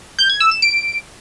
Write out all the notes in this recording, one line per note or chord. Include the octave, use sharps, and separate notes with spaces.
G6
G#6
E6
E7
D7